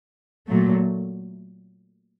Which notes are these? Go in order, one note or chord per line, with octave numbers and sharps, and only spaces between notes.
A#2 F#3 A3